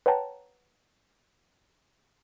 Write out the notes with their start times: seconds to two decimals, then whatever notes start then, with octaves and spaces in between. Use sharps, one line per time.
0.06 B4 C#5 F#5 G5 A5 A#5